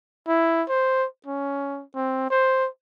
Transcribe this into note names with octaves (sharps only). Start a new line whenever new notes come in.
E4
C5
C#4
C4
C5